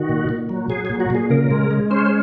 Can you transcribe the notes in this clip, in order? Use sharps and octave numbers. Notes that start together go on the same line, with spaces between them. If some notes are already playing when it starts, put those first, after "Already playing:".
Already playing: D#3 F#4
A#2
A#2
F#3
F#3 G#4
A#2 G#4
F#4
A#2 G#4
C#3 A#4
G#3
G#3
C#4 C5
C5